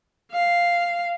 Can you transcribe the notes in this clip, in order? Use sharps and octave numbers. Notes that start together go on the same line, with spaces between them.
F5